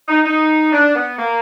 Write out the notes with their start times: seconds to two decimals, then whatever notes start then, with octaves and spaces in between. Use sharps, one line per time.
0.08 D#4
0.24 D#4
0.72 D4
0.94 B3
1.19 A#3